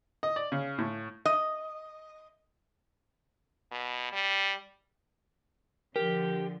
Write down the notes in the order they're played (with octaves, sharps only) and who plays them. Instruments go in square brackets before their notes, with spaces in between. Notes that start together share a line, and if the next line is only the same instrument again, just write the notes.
[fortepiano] D#5
D5
C#3
A2
[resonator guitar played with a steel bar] D#5
[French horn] B2
G3
[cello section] D3 F3 [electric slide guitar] G4 [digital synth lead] A#4